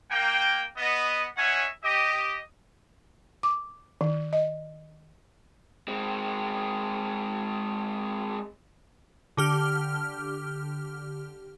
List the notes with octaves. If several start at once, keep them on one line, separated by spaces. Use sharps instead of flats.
A#3 G5
B3 D#5
C#4 D#4 C#5 E5 F#5 G#5
G4 D#5
D6
D#3
D#5
G#3 C4
D3 G4 F6